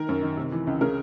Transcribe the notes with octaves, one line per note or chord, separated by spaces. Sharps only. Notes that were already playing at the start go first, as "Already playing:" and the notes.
Already playing: D#3 A#4
F#2
D#3
C3
E3
C#2
C#3 A#4